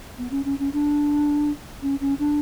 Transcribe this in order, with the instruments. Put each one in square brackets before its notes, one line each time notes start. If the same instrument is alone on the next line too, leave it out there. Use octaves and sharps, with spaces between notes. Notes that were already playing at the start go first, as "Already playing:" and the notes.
[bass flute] B3
C#4
C#4
C#4
D4
C#4
C#4
D4